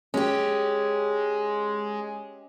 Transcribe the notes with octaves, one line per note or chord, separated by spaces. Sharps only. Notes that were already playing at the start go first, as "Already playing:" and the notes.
G#3 C#4 G4